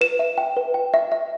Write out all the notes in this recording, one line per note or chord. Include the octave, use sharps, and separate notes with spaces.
B4 E7
E5
G5
B4
G5
E5
E5